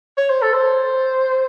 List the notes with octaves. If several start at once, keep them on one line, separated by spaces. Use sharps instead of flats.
C#5
C5
A4
C5